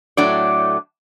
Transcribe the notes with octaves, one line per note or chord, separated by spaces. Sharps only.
A2 F#3 A3 D4 D5